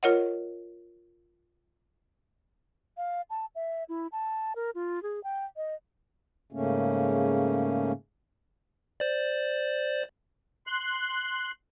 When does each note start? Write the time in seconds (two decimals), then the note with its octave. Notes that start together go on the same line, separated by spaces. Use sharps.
0.03 F4 A#4 C#5 D#5 F#5
2.97 F5
3.30 A5
3.55 E5
3.89 E4
4.12 A5
4.56 A#4
4.75 F4
5.03 G#4
5.24 G5
5.57 D#5
6.52 G#2 C#3 A3 A#3 C#4
9.00 C5 D5
10.67 C6 F#6